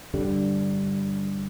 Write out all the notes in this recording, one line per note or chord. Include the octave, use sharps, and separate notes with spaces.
G2 D3 G3